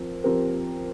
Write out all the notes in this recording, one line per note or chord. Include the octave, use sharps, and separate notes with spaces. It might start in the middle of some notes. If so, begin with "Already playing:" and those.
Already playing: F3 C4 A#4
F3 C4 G4 A#4